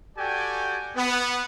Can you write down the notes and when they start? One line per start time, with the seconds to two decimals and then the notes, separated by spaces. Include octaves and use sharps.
0.17 F#4 G4 A4 D5 G5 G#5
0.96 B3